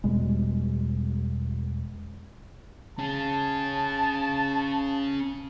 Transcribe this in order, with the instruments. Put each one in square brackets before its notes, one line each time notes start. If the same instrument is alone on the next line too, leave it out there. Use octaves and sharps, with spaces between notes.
[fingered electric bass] E2 B2 G3 G#3
[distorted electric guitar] C#4 G#4 [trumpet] A5